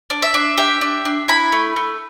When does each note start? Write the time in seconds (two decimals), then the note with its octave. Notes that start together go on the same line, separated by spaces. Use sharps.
0.10 D4
0.22 E5
0.34 D4
0.57 G4 E5
0.81 D4
1.05 D4
1.28 E4 B5
1.52 A3
1.76 A3